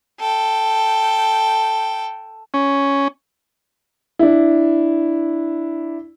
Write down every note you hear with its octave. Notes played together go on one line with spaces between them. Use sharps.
A4 G5
C#4
D4 E4